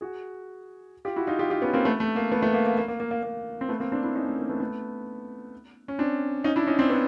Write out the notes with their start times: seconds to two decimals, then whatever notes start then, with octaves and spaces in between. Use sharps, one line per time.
0.01 F#4 G#4
1.05 F4 G4
1.16 E4 F#4
1.27 D#4 F4
1.39 F4 G4
1.50 F4 G4
1.62 B3 C#4
1.73 A#3 C4
1.85 A3 B3
2.00 A3
2.16 A#3
2.32 A3 B3
2.42 A3 B3
2.54 A#3
2.66 A#3
2.78 A#3
2.88 A#3
3.00 A#3
3.11 A#3
3.23 A#3
3.61 C4
3.69 A3 B3
3.80 A#3 C4
3.92 C4 D4
4.03 D4 E4
4.15 C#4 D#4
4.26 A3
4.38 A#3
4.49 A3 B3
4.60 A3 B3
5.88 C#4
5.99 C4 D4
6.44 C#4 D#4
6.56 D4 E4
6.67 C#4 D#4
6.79 C4 D4
6.90 B3 C#4